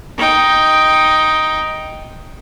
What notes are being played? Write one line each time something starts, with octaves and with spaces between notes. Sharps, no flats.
D#4 G5